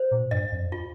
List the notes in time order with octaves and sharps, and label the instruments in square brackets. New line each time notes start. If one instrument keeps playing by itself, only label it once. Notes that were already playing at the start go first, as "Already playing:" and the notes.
Already playing: [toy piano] C5
[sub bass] A#2
[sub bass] G2 [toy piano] D#5
[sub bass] F2
[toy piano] F4